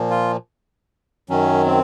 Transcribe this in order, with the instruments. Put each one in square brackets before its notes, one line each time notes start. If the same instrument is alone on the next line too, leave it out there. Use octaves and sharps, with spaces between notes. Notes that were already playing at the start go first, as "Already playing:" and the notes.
Already playing: [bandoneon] A#2 F3
F4
F#2 D#3 F#3 C#4
C4